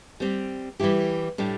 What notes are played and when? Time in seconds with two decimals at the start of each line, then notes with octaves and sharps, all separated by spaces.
0.20 G3 C4 G4
0.80 E3 G3 E4 G4
1.38 A2 G3 D4 G4